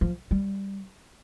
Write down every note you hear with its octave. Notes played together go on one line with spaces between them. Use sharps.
F3
G3